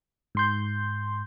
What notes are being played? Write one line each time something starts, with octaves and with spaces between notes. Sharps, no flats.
G#2 C6 G6